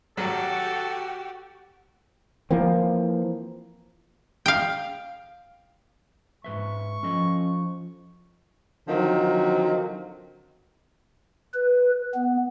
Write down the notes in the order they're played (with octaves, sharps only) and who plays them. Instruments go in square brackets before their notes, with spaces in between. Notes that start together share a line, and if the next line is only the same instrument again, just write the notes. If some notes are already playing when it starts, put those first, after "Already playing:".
[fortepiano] G#1 F#3 [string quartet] F#4 G4 [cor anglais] A4
[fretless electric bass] E3 F3 A#3 C4
[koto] F5 G5
[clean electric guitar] G#2 B4 E5 [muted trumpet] C#6
[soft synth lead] F3 [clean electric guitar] C#4 A4 D#5
[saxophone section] D3 D#3 F3 F#3 C4
[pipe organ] B4
B3